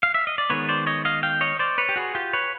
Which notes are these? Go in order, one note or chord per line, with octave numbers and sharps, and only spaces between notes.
F5
E5
D#5
D5
D#3 G#3 B3 B4 C#5
C5 D5
C#5 D#5
D#5 F5
F5 G5
C#5 D#5
C5 D5
B4 C#5
G4
F#4 G#4
F4 G4
B4 C#5